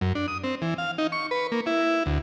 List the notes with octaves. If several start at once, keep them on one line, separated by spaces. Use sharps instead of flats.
F#2
D4
D#6
C4
E3
F5
D#4
C#6
B4
A#3
E4
D2